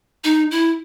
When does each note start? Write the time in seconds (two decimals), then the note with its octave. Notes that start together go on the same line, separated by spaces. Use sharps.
0.24 D#4
0.51 E4